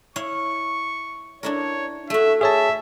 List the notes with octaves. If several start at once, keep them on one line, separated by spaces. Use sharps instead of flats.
E4 C#5 F5 C#6
D4 E4 A#4 C#5
A3 F#4 E5
G#4 C#5 E5 A5